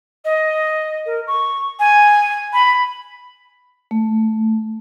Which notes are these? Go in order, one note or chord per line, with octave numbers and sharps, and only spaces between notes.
D#5
A#4
C#6
G#5
B5
A3